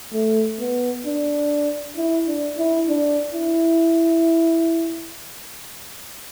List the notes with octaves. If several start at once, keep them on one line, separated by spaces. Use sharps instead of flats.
A3
B3
D4
E4
D4
E4
D4
E4